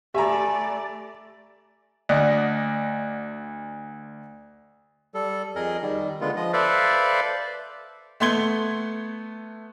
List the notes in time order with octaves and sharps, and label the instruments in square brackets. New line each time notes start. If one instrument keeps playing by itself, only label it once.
[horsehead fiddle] A3 D5 [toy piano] G4 [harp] A4 G#5 B5 [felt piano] E5 A#5
[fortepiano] D2 D4 D5 D#5 F#5
[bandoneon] G3 A4
F2 G#4 A#4 D#5
D#3 G3
D3 G#3 B3 F4
F3 D#5
A4 B4 C5 D5 E5 F5
[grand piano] A3 B3 C6 G#6 G7